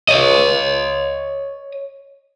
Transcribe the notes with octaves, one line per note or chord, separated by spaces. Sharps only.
C#5 D#5